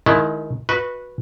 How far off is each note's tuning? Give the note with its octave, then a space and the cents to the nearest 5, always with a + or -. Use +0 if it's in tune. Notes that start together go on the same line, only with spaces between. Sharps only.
D#3 +0 G#3 +30 E4 +0
F#4 -15 B4 -10 E5 -45